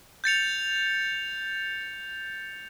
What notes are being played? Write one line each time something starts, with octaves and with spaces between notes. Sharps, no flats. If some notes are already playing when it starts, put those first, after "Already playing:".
G6 A6 C#7 F7